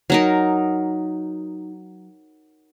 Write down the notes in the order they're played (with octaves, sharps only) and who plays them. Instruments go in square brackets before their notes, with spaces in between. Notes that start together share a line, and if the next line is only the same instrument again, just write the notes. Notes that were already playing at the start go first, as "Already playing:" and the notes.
[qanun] F#3 D#4 A#4